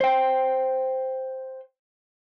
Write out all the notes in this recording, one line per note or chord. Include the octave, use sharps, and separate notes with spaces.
C5 G5